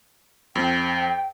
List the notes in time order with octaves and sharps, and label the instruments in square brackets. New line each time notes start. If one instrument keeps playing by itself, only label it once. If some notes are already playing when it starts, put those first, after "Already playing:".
[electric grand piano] F2 [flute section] G5